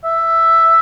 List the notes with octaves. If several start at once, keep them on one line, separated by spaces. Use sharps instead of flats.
E5